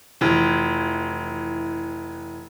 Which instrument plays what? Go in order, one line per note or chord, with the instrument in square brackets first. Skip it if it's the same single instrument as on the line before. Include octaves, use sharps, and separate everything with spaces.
[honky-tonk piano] F1 E3